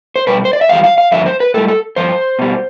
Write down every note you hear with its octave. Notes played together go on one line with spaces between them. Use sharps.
C5
B2 G3 B4
C5
D5
E5
F2 E3 G3 F5
F5
F5
G2 D3 F3 E5
C5
B4
A2 G3 A4
A4
G2 F3 C5
B2 G3